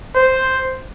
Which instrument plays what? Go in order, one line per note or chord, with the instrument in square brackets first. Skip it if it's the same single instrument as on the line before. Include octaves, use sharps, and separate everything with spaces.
[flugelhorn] C5